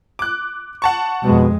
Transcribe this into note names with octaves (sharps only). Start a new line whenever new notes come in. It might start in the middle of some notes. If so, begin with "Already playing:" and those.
D6 F#6
F#5 A5 C#6
F2 B2 G#3